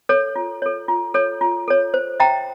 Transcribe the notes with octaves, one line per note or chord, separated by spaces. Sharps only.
A4 C#5
F4
A4 C#5
F4
A4 C#5
F4
A4 C#5
C5
E5 G5 A#5